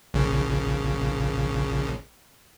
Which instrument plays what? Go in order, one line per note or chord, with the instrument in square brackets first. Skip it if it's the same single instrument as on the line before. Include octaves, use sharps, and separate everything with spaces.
[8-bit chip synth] A#1 C#3